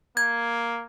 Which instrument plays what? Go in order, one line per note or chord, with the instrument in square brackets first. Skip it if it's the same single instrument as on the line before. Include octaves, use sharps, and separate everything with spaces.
[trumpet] A#3 [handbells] G#6